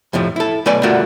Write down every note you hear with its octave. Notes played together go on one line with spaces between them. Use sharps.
F2 A2 C3 F3
E4 A4
B1 A3 B4 D5 G#5 B5
G2 D3 A3 F4 F#4 A#4